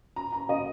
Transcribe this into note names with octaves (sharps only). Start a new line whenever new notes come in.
A#5
A#5
D#5